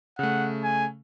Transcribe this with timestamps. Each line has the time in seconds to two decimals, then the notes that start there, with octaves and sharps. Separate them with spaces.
0.19 C#3 A3 F#5
0.64 G#5